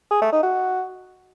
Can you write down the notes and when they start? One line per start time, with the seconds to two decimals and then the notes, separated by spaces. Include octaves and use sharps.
0.11 G#4
0.22 A3
0.33 D#4
0.43 F#4